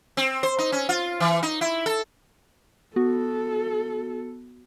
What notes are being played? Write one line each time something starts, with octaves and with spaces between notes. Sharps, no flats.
C4
C5
D#4
C#4
F4
E3
D#4
E4
A4
B3 F#4 A4